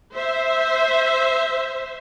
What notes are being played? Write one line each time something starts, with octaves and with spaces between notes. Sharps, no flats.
C5 E5